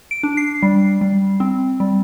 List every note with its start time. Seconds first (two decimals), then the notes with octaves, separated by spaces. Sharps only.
0.11 D7
0.23 D4
0.37 C7
0.63 G3
1.01 G3
1.40 C4
1.80 G3